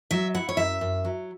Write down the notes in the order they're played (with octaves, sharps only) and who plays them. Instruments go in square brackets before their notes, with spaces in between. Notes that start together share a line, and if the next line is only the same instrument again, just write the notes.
[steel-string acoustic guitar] F#3 E5
E4 F#5
C#5
F#2 E5
F#2
F#3